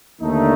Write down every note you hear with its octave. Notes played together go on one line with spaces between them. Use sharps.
D#2 D3 A3 D#4